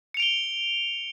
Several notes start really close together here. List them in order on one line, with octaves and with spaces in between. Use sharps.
C#7 F7 D7 G7